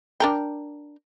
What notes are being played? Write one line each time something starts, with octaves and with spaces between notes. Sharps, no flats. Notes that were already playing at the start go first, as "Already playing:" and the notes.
D4 A#4 G5